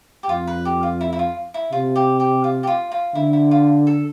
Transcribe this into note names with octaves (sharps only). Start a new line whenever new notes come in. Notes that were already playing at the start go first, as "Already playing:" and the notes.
G4
F2 F4
B4
G4
F4
E4
E4
F4
E4
C3 F4
G4
G4
F4
G4
F4
F4
D3 E4
E4
F4
A4